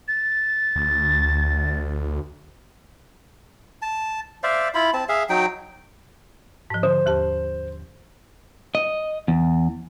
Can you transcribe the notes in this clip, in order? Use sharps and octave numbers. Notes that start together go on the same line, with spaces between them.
A6
D2
A5
C5 D5 E5 F5
E4 F4 B5
C4 A5
G#4 E5 F5
F#3 D#4 G5
G#2 F3
D3 C5
D#2 G4 A5
D#5
E2